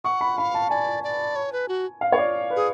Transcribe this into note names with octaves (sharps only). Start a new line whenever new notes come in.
F#5 C#6
B5
F5 B5
A5
D5 G#5
D5
C#5
B4
F#4
F5
C#5
D5
B4
G#4